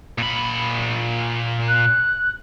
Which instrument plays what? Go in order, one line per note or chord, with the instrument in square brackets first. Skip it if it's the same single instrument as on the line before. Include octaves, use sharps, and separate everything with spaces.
[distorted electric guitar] A#2 B5
[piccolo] F#6